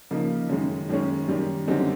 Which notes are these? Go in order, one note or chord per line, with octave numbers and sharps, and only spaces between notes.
C#3 F3 A#3 D#4
F#2 D#3 G#3
F#2 D#3 G#3 C#4
F#2 D#3 G3
F#2 D3 G3 C4 D#4